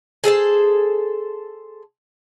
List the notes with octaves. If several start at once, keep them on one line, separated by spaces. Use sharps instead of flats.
G#4 A4 C5 A5